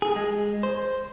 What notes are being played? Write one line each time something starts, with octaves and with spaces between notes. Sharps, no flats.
G#4
G#3
C5